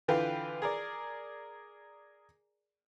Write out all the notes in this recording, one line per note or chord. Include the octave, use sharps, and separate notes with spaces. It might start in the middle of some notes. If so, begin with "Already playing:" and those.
D3 E3 F4 B4 G5
G#4 A#4 D5